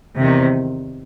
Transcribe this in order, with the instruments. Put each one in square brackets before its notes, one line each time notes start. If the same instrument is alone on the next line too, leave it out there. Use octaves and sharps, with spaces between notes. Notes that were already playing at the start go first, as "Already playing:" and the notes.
[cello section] E2 C3 D#3